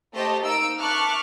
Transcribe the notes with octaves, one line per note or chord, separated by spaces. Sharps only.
A3 G4 C5 D#5 A5
A#3 D#4 E6 D7
E5 A5 C#6 D6 F6 F#6